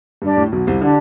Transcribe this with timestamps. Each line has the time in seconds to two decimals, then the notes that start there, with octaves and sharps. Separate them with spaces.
0.22 G2 D4 G4 D5
0.37 A2
0.52 B1 B2
0.67 C2 C3
0.82 D3 D4 G4 D5